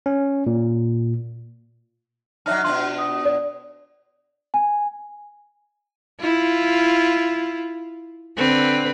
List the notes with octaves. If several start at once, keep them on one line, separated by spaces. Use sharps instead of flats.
C#4
A#2
F#3 D4 D#4 E5 A5 F6 F#6
B2 D4 F4 C6
D#6
D5
G#5
E4 F4
D3 C4 B4